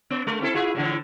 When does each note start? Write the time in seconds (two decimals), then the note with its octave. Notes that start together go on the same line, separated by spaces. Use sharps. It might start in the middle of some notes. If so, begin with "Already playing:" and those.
0.10 B3
0.27 G#3
0.41 C4 E4 A4
0.54 E4 F4 G#4
0.75 A2 D3 E3